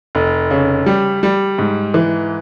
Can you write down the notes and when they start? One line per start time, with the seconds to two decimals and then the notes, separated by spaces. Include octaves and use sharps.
0.15 F1
0.51 C#3
0.86 G3
1.23 G3
1.58 G#2
1.94 E3